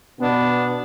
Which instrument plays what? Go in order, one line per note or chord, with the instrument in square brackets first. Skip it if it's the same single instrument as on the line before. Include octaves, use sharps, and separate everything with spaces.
[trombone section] B2 B3 [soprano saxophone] D4